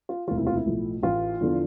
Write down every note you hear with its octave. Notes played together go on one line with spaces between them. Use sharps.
F4
E1 D2 C3 E3 F4
E4
F4
E4
B1 A2 F3
A1 A2 E3 F4
E2 D3 F3